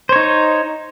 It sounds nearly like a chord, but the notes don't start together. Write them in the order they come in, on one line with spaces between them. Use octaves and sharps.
C5 C#5 D#4